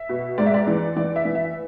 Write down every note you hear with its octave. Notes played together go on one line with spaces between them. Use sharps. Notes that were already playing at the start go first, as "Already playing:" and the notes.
Already playing: E5
B2
G#2 D5
E5
D5
E3
E3 D5
E5
E3
E5